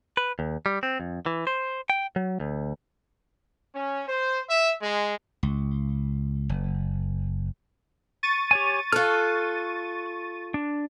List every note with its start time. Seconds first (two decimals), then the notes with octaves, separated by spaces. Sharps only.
0.17 B4
0.39 D#2
0.66 G3
0.83 C4
1.00 F2
1.26 E3
1.47 C5
1.90 G5
2.16 F#3
2.40 D2
3.74 C#4
4.06 C5
4.48 E5
4.81 G#3
5.43 C#2
6.49 F#1
8.23 C#6 A6 D#7
8.51 G4 C#5 G#5
8.92 F4 A4 F6 F#6
10.54 D4